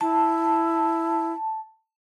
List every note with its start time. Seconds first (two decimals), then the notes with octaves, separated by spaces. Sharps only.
0.01 E4 A5